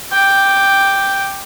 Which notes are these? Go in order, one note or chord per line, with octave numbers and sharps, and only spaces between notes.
G5 D6